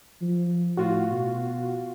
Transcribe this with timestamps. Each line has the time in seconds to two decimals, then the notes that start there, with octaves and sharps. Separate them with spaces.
0.22 F3
0.77 A2 F4 F#4
1.11 B2